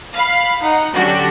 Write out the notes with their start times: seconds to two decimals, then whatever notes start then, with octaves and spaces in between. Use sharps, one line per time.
0.13 F5 B5
0.60 D#4 F#5
0.95 D3 F#3 C#4 D4 F#4 G4